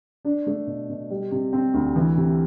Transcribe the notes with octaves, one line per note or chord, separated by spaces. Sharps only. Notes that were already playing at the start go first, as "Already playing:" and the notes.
D4
A3
B2
B2
G3
C3
C4
D2
E3
C3